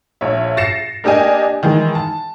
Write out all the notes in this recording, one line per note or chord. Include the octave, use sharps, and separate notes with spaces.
A#1 C#5 E5
A6 A#6 C7 C#7 E7
A#3 D4 G4 D#5 G#5
D#3 E3 G#3
A5